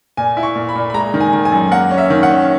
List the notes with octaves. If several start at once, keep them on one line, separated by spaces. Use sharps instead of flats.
A#2 G#5
E4
C#6
A#2
B5
A#2
B5
G#3 A#5
D#3
G#5
D#3
G#5
F#2
A#3 F#5
C#4
E5
D#3
F#5
C#4